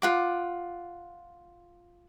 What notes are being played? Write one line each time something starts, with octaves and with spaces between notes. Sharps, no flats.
F4 F#5 D6